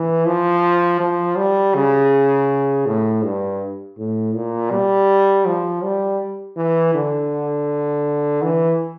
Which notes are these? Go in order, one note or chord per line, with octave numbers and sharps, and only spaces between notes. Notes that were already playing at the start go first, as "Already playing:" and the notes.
Already playing: E3
F3
F3
G3
C#3
A2
G2
A2
A#2
G3
F3
G3
E3
D3
E3